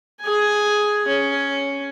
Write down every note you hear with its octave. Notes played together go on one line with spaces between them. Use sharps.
G#4 G#5
C#4